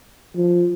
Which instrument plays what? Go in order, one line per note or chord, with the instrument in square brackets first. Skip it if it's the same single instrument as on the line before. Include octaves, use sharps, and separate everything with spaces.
[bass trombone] F3